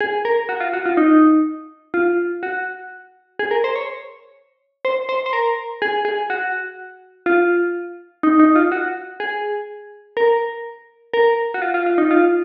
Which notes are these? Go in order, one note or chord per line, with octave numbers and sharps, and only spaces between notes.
G#4
A#4
F#4
F4
F#4
F4
D#4
F4
F#4
G#4
A#4
C5
C#5
C5
C5
C5
A#4
G#4
G#4
F#4
F4
D#4
D#4
F4
F#4
G#4
A#4
A#4
F#4
F4
F4
F4
D#4
F4